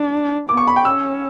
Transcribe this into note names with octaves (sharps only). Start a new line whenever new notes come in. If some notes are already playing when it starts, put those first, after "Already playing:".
Already playing: D4
B3 D6
C#6
B5
G5
C#4 E6